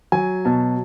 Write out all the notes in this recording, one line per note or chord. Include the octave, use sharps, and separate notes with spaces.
F#3 G#5
B2 A5